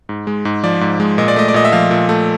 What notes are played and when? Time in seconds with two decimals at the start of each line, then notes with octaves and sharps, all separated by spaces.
0.09 G#2
0.27 G#3
0.45 G#2
0.63 F3 D5
0.81 G#2
1.00 G#3
1.18 A#2 D#5
1.28 D5
1.36 A3 D#5
1.48 D5
1.54 A#2 D#5
1.65 E5
1.72 F3 F5
1.91 A#2
2.09 A3